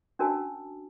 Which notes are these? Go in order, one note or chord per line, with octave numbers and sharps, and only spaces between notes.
C#4 D4 F#4 A#4 G#5 A5